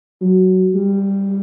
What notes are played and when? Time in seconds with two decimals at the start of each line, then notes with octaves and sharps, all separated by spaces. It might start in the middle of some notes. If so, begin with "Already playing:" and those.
0.21 F#3
0.75 G3